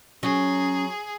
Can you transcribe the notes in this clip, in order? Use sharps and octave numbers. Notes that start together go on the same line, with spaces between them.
F#3 C#4 G#4